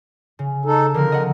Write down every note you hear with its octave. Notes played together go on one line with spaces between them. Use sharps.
C#3
D#4 A4
D3 F3 C4 A#4
D#5 F#5